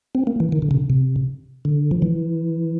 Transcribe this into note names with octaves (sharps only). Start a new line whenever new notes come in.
C4
A#3
E3
D#3
D3
C#3
C3
D3
F3
E3